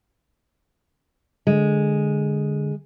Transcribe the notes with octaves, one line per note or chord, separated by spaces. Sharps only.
D3 G#3